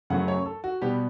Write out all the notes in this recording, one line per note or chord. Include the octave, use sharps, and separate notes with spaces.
F#2 C#3 F#3 A3 F#5
C#5
A4
F#4
B2 G3 B3 G4